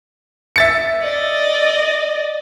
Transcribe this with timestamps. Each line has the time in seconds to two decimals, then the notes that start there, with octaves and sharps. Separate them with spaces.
0.56 E5 A6 C#7
1.02 D5 D#5